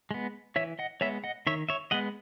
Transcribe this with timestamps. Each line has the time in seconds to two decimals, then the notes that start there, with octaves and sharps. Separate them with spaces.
0.11 G#3 B3
0.56 E3 C#5 E5
0.79 D#5 F#5
1.01 G#3 B3 C#5 E5
1.24 D#5 F#5
1.47 D#3 C#5 E5
1.69 C#5 E5
1.91 G#3 B3 D#5 F#5